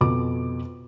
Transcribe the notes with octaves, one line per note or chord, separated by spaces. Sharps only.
F2 B2 D6